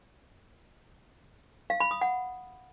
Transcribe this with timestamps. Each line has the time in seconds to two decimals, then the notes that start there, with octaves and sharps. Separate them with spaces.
1.70 F5
1.80 B5
1.91 D#6
2.01 F#5